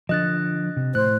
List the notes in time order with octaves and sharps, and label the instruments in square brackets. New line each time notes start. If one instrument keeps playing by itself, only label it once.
[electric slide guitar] D3 F3 [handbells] D#5 F#6 A6
[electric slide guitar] C3
[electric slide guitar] A2 [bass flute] C5 [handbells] F#6